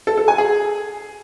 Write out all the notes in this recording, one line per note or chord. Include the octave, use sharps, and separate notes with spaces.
A4
A4
G#5
G#4